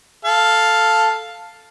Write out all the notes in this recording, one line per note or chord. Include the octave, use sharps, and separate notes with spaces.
A4 F5